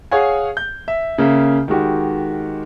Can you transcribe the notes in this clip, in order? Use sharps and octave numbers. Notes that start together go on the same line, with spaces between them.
G#4 C#5 F5 F#5 G#5
G6
E5
C#3 A#3 E5
D#3 G#3 F#4 G4